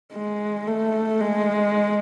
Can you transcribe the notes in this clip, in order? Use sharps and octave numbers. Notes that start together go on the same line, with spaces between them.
G#3
A3
G#3